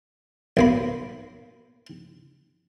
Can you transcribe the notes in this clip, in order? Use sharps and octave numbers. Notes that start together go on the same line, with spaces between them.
B1 A#3 B5